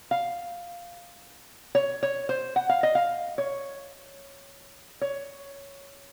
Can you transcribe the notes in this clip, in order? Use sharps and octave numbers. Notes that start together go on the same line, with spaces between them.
F5
C#5
C#5
C5
F#5
F5
D#5
F5
C#5
C#5